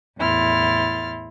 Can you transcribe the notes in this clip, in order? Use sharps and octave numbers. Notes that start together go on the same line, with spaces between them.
E2 A2 E4 C6 F6 A6